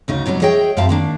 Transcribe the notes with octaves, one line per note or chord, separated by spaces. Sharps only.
D2 C#3 D#4
B2 F#3 G3 C#4
G#4 C#5 D#5 E5 G5
F#2 C4 E5 F5 A5
D#3 A#3 D4